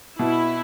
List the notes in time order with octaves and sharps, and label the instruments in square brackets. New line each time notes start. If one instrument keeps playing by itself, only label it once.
[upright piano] B2 [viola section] E4